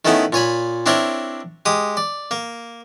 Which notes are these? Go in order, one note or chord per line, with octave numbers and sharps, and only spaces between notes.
D#3 A3 B3 C#4 E4
A#2 C#5 G#5 B5
C4 D4 E4 A#4 C#5
G#3 G4 D#6
D5
A#3